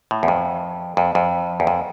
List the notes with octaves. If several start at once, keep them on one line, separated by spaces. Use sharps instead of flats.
A2
E2
F2
F2
F2
E2
F2